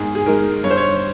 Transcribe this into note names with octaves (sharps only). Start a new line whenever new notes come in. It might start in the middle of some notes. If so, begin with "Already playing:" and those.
Already playing: G#2 D#3 G#3 G#4
G#4
D#3 G#3 A#4
G2 C#5
C5
C#5